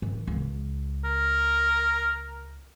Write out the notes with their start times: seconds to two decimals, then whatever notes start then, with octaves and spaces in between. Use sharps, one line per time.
0.02 D#3 E3
0.27 C#2
1.04 A#4